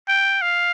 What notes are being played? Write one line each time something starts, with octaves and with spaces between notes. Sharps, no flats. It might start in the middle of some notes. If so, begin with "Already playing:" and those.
G5
F5